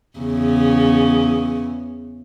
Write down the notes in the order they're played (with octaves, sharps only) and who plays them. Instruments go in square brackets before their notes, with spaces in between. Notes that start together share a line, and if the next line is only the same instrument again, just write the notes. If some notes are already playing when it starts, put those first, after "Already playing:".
[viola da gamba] E2 C#3